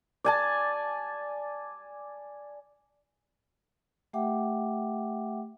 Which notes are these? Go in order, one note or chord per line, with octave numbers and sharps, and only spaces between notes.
D5 G#5 A5
A3 G4 E5 F#5 G5 D6